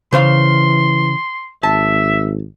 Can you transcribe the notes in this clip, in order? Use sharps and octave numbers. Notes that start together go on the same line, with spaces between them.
C#3 E3 C5 F5 C6
G#1 E5 A5